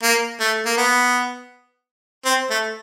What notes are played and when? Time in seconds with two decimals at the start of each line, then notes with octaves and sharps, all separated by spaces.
0.03 A#3
0.40 A3
0.66 A#3
0.78 B3
2.25 C4
2.50 A3